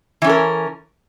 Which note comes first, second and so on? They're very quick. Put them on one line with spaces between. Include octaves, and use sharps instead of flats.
E3 C#4 A4 A#4